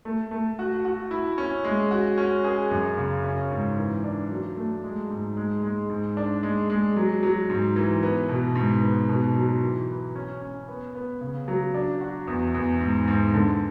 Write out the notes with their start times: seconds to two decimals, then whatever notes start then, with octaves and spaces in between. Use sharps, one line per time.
0.05 A3
0.31 A3
0.59 F#4
0.85 F#4
1.11 E4
1.38 C#4
1.64 G#3
1.91 F#4
2.18 C#4
2.44 G#4
2.71 F#2
2.97 C#3
3.24 C#4
3.51 G#2
3.77 E3
4.04 D4
4.30 F#3
4.57 A3
4.84 G#3
5.10 G#2
5.37 G#3
5.63 G#3
5.90 G#2
6.17 D4
6.43 G#3
6.70 G#3
6.96 F#3
7.23 F#3
7.50 G#2
7.76 E3
8.03 B3
8.29 B2
8.55 G#2
8.82 B3
9.09 B2
9.36 F#3
9.62 E3
9.89 B4
10.16 C#4
10.42 C#4
10.68 B3
10.95 B3
11.21 C#3
11.48 F#3
11.74 D4
12.01 F#4
12.27 E2
12.54 E2
12.81 G#2
13.08 G#2
13.34 D3